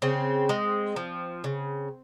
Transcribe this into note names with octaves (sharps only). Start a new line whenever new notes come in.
C#3 C4
G#3
F3
C#3